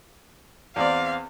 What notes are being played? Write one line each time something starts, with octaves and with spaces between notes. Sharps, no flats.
E2 C4 D5 F5